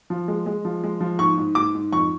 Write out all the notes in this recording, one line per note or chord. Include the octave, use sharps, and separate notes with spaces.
F3
G#3
G#3
F3
G#3
F3
G#2 C#6
G#2
G#2 D6
G#2
F2 C#6